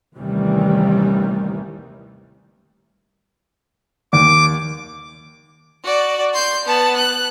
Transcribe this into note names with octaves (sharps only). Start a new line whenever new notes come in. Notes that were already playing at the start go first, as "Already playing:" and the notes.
A1 D#2 C3 D#3 E3 G3
D#2 D6
F#4 D5
C6 G6
B3 A5
F#6